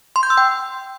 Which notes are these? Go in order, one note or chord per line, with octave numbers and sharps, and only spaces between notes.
C6
G6
E6
G5